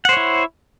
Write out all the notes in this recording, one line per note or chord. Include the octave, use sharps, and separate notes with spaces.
E4 C5 C#5 F#5